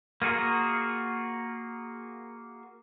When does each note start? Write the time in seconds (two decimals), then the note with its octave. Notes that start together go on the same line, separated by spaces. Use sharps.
0.22 A#3 F4 F#4 G#4 A#4